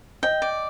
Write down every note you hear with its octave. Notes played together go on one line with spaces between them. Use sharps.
D#5 G5
D5